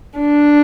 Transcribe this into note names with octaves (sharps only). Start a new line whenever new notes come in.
D4